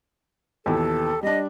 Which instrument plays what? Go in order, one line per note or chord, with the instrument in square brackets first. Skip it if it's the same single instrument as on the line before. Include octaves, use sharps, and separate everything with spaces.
[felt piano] D#2 B2 E3 [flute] A4
[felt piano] G3 D4 [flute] D#5